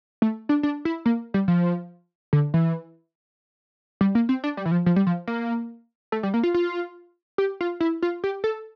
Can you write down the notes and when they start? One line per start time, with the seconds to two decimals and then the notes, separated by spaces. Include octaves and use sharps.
0.22 A3
0.49 D4
0.63 D4
0.85 E4
1.06 A#3
1.34 G3
1.48 F3
2.33 D3
2.54 E3
4.01 G3
4.15 A#3
4.29 C4
4.44 D4
4.57 G3
4.66 E3
4.71 F3
4.86 F3
4.96 G3
5.07 F3
5.27 A#3
6.12 A3
6.23 G3
6.34 A#3
6.43 F4
6.54 F4
7.38 G4
7.61 F4
7.80 E4
8.02 F4
8.24 G4
8.44 A4